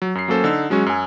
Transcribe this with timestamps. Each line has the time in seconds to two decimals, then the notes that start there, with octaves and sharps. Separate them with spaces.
0.02 F#3
0.15 F#2 C7
0.28 F#3 A#3 C#4 A4 C5
0.44 D3 D#4 E6
0.70 F#3 G#3 C#4 F#4
0.86 F#2 G#5